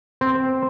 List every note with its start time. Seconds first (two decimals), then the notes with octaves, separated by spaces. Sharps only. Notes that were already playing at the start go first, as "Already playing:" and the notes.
0.21 C4